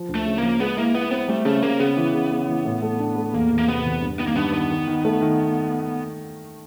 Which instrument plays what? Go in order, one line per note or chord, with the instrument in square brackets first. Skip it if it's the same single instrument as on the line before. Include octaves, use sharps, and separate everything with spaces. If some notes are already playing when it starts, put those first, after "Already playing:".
Already playing: [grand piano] F3
D2
[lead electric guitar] A3
[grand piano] C#3
[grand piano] F3 [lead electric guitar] A#3
[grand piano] G#3 [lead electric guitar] B3
[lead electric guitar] A#3 [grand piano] E4
[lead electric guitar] B3 [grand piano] E4
[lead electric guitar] B3 [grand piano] C4
[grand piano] G3 [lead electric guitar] A3
[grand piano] C#3 [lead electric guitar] A3
[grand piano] C#3 [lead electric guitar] A#3
[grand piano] C#3 [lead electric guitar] B3
[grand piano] E3
C#3
C#3
E3
A2
A3
D4
A3
[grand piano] E2 [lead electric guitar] A#3
[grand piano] E2
[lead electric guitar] A#3
[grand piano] C3 [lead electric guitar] B3
[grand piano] E2
G2
[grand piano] D#3 [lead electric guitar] B3
[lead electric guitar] A#3
[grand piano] G2 [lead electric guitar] B3
[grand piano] D#3 [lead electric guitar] B3
[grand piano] D#3
D#3
A3
D#3